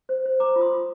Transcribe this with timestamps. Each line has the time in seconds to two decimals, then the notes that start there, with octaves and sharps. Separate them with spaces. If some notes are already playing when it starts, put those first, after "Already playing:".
0.09 C5
0.26 C5
0.40 C5 A#5 D6
0.56 F4
0.61 C6 D#6
0.72 F4